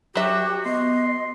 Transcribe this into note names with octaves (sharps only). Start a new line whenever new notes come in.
F#3 F#4 G4 E5
B3 D#5 C6